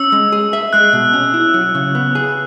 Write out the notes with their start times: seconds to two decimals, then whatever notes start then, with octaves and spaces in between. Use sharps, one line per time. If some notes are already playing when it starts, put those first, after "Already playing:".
Already playing: C#4 E6
0.12 G#3
0.32 G#4
0.53 E5
0.73 G#3 F#6
0.93 B2
1.13 C#4
1.34 E4
1.54 F#3
1.75 C#3
1.95 B3
2.15 G#4